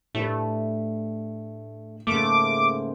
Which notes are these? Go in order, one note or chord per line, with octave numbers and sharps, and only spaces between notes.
A2 A3 D4 G4 B4
G#2 C#3 A3 A#3 D6